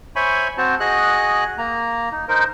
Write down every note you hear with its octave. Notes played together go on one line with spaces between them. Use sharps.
C5 C#5 E5 G#5 B5 C#6
C4 F#4 C5 A5
F#4 G#4 D#5 F#6
A#3 A#5
D#4
D#4 A#4 C5